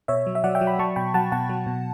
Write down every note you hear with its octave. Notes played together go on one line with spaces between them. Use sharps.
B2 C#5 E5
F#3
E5
F#3 D5 F#5
E5 G5
F#3
G5 B5
F#3 A5 C#6
B2 G5 B5
F#3 F#5 A5
B2 F#5 A5
F#3
B2